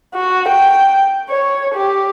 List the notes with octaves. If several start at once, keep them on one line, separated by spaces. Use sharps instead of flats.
F#4
G5
C#5
G4